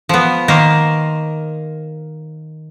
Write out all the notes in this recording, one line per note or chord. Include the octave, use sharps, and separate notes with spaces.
F3 B3
D#3 A#3 A#4 C5